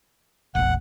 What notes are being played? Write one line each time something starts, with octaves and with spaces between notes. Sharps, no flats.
E1 A#1 F#5